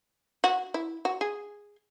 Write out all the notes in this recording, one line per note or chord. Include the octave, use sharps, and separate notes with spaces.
F#4
E4
F#4
G#4